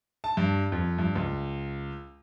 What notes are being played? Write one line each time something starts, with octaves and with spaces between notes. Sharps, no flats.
A5
G2
F2
G2
C#2